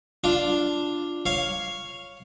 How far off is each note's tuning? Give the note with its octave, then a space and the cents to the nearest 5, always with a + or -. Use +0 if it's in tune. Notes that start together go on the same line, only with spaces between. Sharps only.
D4 +0 F4 -5
C#5 +0 F5 +0